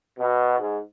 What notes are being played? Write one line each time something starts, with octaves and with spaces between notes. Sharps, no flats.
B2
G#2